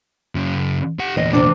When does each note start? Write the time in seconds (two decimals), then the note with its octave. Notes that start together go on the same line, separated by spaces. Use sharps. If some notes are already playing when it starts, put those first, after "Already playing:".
0.35 F#2 C#3
0.99 G4 F#5
1.17 E2 A#2 D#5
1.33 D2 C3 D4